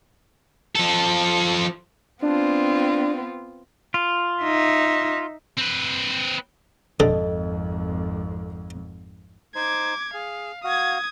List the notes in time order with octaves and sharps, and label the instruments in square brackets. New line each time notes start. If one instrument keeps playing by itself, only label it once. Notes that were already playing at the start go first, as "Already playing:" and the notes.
[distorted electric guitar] F3 A4
[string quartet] B3 C4 F4 [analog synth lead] D4
[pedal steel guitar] F4
[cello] D#4 E5
[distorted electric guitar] C4 B4
[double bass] G#1 F2 [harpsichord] D3 [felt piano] A4 D#5
[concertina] D#4 C5 [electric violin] D6 G#6
[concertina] G#4 [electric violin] F5
[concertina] F#4 F5 [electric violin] D#6 G#6